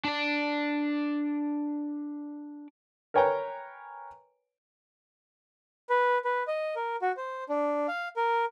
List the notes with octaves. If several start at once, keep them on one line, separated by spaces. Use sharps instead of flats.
D4 D5
A#4 B4 C#5 G5 G#5 A#5
B4
B4
D#5
A#4
F#4
C5
D4
F5
A#4